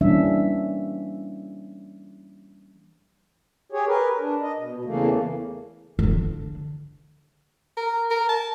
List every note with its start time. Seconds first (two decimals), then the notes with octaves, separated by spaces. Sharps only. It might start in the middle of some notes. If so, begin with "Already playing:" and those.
0.01 E3 G3 A#3 C#4 D4 E5
3.72 G4 G#4 C#5
3.87 A#4 B4
4.20 D4
4.42 D#5
4.58 B2
4.85 E2 C#3 E3 A3 A#3
5.99 D3 D4
7.77 A#4
8.10 A#4
8.29 A5